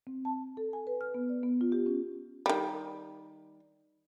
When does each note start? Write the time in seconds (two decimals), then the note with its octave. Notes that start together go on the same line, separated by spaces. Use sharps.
0.07 C4
0.25 A5
0.57 A4
0.73 G#5
0.87 B4
1.01 F6
1.14 B3
1.29 D5
1.43 B3
1.61 F4
1.72 G4
1.86 C#4
2.46 D#3 G3